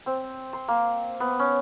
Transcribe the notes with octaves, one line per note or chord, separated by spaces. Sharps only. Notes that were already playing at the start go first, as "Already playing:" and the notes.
C4
C6
A#3
B3
C#4